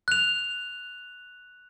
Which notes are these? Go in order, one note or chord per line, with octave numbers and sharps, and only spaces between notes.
F#6 F7